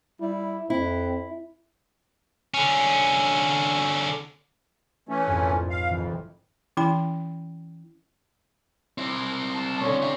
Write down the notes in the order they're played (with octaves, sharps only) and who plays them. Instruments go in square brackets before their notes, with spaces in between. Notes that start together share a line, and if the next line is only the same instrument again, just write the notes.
[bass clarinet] G3 [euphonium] E4
[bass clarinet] F2 [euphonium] C4 [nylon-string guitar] E4
[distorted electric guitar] D3 C#4
[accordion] E3 A3 C#4
[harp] A#1 F2 G#2
[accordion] F5
[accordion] F2 [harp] E3
[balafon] E3 C#4 E4 G5 B5
[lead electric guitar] C4 E4
[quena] A5
[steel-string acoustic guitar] D3 C#4 [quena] C#6
[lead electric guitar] C4 E5